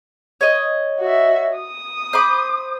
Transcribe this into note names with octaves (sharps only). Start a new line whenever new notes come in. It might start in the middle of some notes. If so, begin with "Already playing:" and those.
C#5 D#5
F#4 E5
D#6
C5 B5 D6